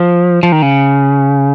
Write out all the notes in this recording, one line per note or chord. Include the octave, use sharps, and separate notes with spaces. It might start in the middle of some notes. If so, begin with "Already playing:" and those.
Already playing: F3
F3
D#3
C#3